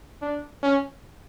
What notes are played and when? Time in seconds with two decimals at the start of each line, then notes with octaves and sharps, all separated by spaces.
0.22 D4
0.63 C#4